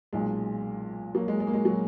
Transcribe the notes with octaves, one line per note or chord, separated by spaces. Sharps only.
B1 A#2 G#3
F#3 A#3
G#3
G#3
A#3
G#3
F#3